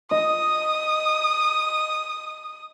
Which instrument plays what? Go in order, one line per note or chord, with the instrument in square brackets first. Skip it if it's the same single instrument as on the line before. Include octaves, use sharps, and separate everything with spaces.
[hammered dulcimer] D#5 [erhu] D#6